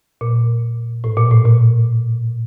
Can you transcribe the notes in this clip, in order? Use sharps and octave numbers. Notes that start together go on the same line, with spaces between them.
A#2
A2
A#2
A2
A#2